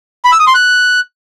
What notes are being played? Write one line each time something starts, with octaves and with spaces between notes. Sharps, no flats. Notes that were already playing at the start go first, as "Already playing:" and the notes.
B5
E6
D#6
C6
F#6